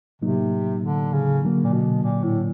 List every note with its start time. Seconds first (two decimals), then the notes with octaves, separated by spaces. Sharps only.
0.22 A2 C3 F#3 A#3 D#4
0.82 D3
1.12 C#3
1.43 D3 F#3 A#3
1.64 A#2
1.73 B2
2.03 A#2
2.23 A2